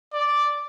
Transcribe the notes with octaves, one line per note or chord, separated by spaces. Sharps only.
D5